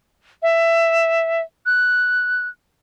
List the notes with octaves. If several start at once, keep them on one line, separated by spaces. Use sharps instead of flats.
E5
F#6